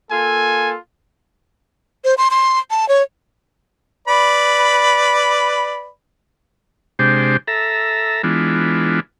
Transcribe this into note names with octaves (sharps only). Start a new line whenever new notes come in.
A#3 F4 A4 G#5
C5
C6
C6
A5
C#5
B4 D5 B5
C3 G#3 D4 G4 C5
A4 E5 A#5
E3 G#3 B3 D4 F4